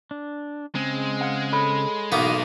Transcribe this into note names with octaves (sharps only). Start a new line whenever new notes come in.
D4
C#3 G#3 C4
F5 F#5
A4 C#5 B5
B1 E3 A#3 B3 D#4 F#4 G#4